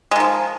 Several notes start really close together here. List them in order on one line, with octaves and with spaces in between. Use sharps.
G#3 D#3 F3